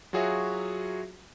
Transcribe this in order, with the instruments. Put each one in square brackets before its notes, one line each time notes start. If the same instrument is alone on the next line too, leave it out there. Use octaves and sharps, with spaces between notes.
[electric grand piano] F#3 F4 F#4 G#4 C#5 E5